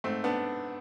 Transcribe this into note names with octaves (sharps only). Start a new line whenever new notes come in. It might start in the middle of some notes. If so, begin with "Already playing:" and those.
G#2 A3 C4
B3 D4